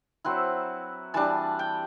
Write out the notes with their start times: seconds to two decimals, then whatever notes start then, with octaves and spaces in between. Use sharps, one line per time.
0.24 F#3 C4 E4 B4
1.14 E3 G3 D4 A5
1.59 G5